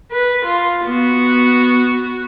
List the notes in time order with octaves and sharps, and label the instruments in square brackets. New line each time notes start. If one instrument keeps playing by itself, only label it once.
[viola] B4
F4
B3 F#4